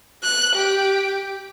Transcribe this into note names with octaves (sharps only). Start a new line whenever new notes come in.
F#6
G4